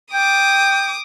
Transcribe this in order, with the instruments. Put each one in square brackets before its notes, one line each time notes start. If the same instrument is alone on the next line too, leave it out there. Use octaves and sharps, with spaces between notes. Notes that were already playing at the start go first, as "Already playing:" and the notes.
[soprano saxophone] G5 [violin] D6 D#6